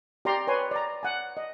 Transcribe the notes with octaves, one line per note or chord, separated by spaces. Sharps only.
G4 D5 G5 A#5 C6
B4 C#5 G#5 C6
D5 A#5
F#5 G#5
D#5